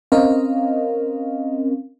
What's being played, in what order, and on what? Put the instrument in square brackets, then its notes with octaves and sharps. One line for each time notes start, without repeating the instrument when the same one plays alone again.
[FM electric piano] C4 C#4 A#4 D#5 F5